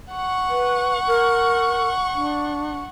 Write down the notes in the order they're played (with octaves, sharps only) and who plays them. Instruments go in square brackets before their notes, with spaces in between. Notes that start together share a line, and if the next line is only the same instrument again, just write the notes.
[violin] F#5 C#6
[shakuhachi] B4
A#4
D4